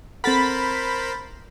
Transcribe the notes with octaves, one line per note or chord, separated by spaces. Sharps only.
C4 A4 A#4 C5 F#5 B5 A6 B6